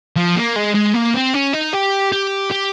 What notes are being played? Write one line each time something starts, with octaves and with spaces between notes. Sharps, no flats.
F3
A#3
G#3
G#3
A#3
C4
C#4
D#4
G4
G4
G4